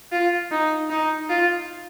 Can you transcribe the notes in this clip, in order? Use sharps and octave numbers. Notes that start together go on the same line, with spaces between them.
F4
D#4
D#4
F4